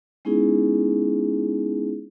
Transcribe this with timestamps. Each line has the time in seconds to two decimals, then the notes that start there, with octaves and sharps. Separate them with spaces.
0.25 G#3 B3 C#4 D#4 E4 G#4